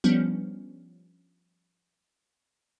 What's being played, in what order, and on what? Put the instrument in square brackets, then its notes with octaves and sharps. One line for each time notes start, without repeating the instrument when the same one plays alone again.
[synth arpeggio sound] F3 G3 B3 C#4 D4